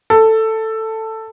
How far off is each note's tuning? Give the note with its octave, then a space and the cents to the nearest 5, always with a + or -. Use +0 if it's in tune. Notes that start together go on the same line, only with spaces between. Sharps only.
A4 +10